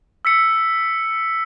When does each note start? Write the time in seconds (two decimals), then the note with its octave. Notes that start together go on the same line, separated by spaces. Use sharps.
0.25 E6 B6 C#7